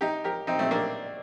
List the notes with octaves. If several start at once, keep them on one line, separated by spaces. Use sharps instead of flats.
D#4 G4
G4 A#4
C4 D#4
A3 C4
A#3 D4